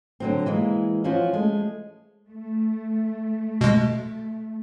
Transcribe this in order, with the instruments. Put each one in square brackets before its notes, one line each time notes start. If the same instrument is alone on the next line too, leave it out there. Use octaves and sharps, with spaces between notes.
[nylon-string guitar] D3 F#3 C4
E3 G#3 A#3
F3 C#4 F4 F#4
G#3 A3
[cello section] A3
[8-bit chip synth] B2 G#3